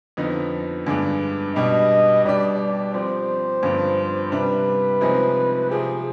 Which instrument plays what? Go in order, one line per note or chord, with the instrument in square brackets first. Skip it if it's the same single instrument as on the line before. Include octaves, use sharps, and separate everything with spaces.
[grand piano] F2 D3 F3 B3 D#4
G2 D3 G#3 B3 D4
[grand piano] B2 G3 D4 [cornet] D#5
[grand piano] B2 G3 D4 G4 [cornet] D5
[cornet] D5
[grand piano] F3 C4 G4 [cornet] C5
[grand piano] G2 D3 F3 B3 D4
[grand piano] C3 G3 D4 [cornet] B4
[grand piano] C3 F3 G#3 C4 D#4
[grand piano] C3 F3 C4 G4 [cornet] G#4